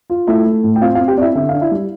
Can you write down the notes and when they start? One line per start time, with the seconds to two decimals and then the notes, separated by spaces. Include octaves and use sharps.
0.10 F4
0.27 A3 E4 E5
0.46 A3
0.64 A2
0.76 G5
0.81 C4 F4 F5
0.95 F4 F5
0.99 C4
1.08 G4 G5
1.17 C4 D5
1.22 E4 E5
1.35 D3 E5
1.49 D4 F5
1.61 E4 E5
1.71 G3